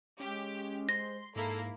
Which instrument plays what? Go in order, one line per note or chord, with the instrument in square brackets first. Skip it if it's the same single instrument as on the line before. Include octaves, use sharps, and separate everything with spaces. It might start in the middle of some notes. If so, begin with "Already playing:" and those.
[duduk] G#3 [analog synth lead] C#4 [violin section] G4
[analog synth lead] C5 [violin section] C6 [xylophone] A#6
[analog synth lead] G#2 [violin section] A#3 E4 [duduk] A4